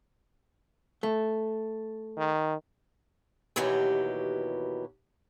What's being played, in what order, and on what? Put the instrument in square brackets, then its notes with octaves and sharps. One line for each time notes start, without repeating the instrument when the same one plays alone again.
[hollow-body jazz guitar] A3
[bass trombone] D#3
[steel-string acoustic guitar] D#2 B2 E3 F#3 G4